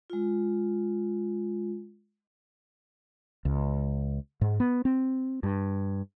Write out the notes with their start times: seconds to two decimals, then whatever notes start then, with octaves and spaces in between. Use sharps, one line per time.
0.10 G#3 F4
3.45 C#2
4.41 G#2
4.60 B3
4.85 C4
5.43 G2